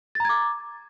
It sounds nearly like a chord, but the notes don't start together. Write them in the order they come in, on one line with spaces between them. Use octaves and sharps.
A6 A#5 G#6 D6